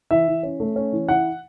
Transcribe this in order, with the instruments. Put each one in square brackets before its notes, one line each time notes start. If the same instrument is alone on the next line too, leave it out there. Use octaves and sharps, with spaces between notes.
[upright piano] E3 E5
E3
C#4
A3
C#4
E3
E4 F#5